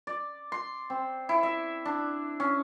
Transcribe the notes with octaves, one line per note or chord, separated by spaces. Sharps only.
D5
C6
C4
E4
E5
D4
C#4